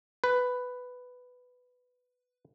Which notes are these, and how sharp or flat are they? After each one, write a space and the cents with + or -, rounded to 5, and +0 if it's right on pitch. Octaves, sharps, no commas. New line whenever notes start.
B4 +10